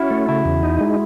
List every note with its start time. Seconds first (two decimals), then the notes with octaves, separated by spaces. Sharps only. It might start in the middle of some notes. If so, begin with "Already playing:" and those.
Already playing: C#4 E4 F#4
0.10 A3
0.28 C#3 E4
0.45 E2
0.63 D#4
0.81 G#3